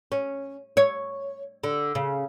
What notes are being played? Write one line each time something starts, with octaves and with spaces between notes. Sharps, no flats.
C#4
C#5
D3
C#3